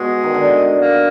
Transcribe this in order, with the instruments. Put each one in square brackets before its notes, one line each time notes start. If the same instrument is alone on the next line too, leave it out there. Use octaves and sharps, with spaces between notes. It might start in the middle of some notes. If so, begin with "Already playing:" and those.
Already playing: [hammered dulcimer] B2 [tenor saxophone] G#3
[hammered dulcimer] D#3
D3
[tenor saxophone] A#3